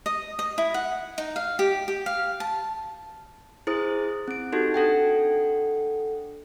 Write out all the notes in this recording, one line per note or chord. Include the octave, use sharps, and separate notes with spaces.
D#5
D#5
E4
F#5
D#4
F5
G4
G4
F5
A5
E4 G#4 C5 D#6
C4 D7
D#4 F#4 G4 A4
D4 A4 F#5 G5